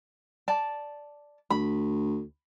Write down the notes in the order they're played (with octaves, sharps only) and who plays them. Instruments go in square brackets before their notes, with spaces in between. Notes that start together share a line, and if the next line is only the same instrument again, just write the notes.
[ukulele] D5 A5
[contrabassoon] D2 [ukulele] B5